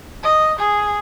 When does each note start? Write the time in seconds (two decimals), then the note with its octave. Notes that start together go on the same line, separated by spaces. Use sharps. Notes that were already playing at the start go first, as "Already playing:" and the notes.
0.23 D#5
0.58 G#4